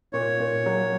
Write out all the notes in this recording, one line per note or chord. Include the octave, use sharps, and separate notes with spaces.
A#2 C#5
A#2
F#3